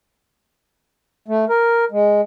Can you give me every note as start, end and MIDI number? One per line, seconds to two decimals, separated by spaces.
1.28 1.45 57
1.49 1.85 70
1.92 2.21 56